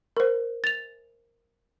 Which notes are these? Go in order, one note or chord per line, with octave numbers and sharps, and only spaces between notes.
A#4 C5
A6 F7